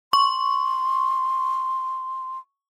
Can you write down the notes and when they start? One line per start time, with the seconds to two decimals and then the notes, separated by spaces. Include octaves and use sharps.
0.13 C6 C#6